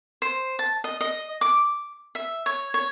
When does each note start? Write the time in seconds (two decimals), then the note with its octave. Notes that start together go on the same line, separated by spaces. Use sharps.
0.22 C5
0.59 A5
0.84 D#5
1.01 D#5
1.41 D6
2.15 E5
2.46 C#5
2.74 C#5